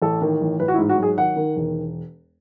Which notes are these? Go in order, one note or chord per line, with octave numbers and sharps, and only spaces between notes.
A1 A4
D#3
A1
A1 B4
F#4
E4
G#2
F#4
F#3 G#4
D#3 F#5
D#3
E1